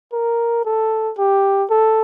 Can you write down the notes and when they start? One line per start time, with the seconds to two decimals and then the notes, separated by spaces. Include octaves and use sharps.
0.13 A#4
0.65 A4
1.18 G4
1.70 A4